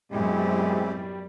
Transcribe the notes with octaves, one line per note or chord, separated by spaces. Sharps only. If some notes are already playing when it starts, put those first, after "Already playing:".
F#2 B2 G3 G#3 C4 E4 G4